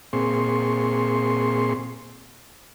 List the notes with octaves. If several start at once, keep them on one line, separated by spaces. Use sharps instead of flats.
A#2 C4 G#4 C6 C#6